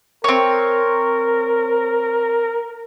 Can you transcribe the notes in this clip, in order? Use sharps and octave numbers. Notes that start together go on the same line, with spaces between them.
C4 A#4 C#5